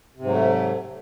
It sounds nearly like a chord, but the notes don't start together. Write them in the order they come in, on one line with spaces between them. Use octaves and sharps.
C3 G#2 F#3 A3